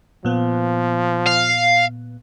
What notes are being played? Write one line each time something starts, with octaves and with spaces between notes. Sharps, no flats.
A#2 F3 B3
F5